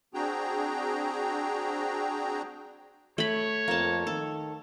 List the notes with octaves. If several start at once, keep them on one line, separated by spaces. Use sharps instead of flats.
C4 D4 F#4 G#4 G5 A#5
A3 C#5 B5
F2 A#3 A5
D#3 A4